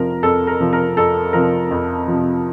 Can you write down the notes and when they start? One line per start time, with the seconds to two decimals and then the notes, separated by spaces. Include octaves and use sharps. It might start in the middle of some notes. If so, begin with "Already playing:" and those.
Already playing: F2 C3 F3 A#4
0.23 F2 A4
0.47 A#4
0.60 C3 F3
0.73 A#4
0.97 F2 A4
1.33 C3 F3 A#4
1.71 F2
2.07 C3 F3